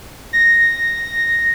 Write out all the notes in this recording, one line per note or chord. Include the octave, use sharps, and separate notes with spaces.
A#6